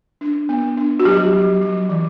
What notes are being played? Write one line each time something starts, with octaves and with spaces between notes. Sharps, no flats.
D4
B3
D4
F#4
F#3 G4
F#3
F#3
E3